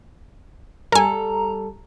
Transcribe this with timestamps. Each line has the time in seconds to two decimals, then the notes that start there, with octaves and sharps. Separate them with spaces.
0.92 G3 A4 A#4 G#5 A#5